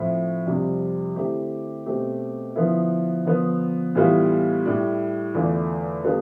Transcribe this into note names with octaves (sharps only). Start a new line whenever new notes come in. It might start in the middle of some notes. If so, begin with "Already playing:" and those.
Already playing: A2 F3 C4 E4
F2 C3 G3 D4 G4
D3 A3 C4 E4 G4
B2 A3 C4 G4
D3 F3 B3 E4
D3 F3 B3
A2 E3 G3 B3 F4
A2 G3 D4
E2 D3 A3 D4 F4
D3 G3 B3 F4 A4